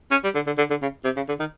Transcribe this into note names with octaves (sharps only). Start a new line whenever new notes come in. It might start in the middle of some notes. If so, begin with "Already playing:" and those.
C#4
G3
D3
D3
D3
D3
C#3
C3
C#3
D3
D#3